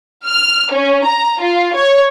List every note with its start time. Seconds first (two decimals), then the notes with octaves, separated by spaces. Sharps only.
0.25 F6
0.71 C#4
1.04 A#5
1.41 F4
1.74 C#5